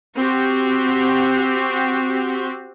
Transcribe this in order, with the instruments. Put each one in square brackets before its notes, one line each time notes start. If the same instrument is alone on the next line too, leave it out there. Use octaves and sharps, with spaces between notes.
[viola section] C4 F#4 G4